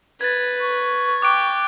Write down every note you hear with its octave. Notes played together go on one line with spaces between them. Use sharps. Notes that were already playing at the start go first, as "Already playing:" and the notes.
B4 G#6 A6
C#6
G5 D6 F#6 D7